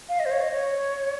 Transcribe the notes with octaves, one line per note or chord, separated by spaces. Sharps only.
F5
D#5
C5
C#5
D#5
C#5